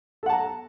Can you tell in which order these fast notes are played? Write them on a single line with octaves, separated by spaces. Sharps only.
A4 F#5 A5 A#5